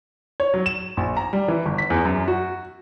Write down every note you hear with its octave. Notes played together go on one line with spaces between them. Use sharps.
C#5
F#3
E7
A#1
A#5
G3
E3
G1
B6
E2
F#2
F#4